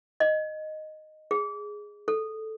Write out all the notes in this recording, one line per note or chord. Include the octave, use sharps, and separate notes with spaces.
D#5
G#4
A4